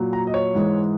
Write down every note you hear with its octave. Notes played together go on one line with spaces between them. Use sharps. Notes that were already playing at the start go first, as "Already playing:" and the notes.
Already playing: A#2 F#3
A#5
D#5
C#5
G#2 E3 G#3